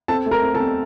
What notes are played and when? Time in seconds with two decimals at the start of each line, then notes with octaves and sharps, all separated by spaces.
0.08 C4 A4 A5
0.26 A3
0.31 A#4 A#5
0.43 C4
0.54 A4 A5
0.60 C4